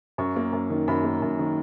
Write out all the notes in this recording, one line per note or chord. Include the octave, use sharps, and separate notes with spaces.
F#2 C#6
A#3
F#2
D#3
F#2 B5
A#3
F#2
D#3